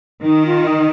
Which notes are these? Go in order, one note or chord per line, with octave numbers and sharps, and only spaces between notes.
D#3 D#4
F4
D#4